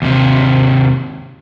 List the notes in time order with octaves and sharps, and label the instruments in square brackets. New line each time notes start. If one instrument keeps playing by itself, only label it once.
[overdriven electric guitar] D#2 C3